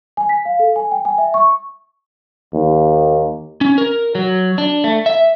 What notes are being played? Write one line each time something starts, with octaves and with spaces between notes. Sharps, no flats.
G#5
B6
F5
A4
G#5
G5
G#5
E5
C#6
D#2
C#4
A#4
F#3
D4
A3
E5